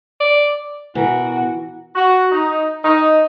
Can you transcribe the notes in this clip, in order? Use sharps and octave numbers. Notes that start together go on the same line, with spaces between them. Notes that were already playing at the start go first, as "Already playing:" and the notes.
D5
B2 E3 F#4 A#4
F#4
D#4
D#4